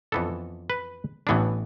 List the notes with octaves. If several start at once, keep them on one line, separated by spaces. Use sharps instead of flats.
F2 E3 B3 D4 A4
B4
A1 A2 E3 B3 D4